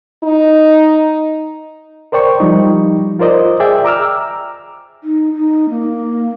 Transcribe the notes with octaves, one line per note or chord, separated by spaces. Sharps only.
D#4
A#4 C5 D5 G5 C#6
F3 G3 D#4
F4 A#4 C5 D5 D#5
G#4 D5 E5 G5
A#5 D6 E6 F6
D#4
D#4
A#3